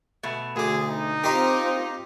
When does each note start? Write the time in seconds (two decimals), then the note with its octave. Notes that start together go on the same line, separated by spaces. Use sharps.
0.23 B2 A3
0.56 D2 G#4 D6
0.89 D#4
1.24 C4 F4 G4 A#4 C5 D#5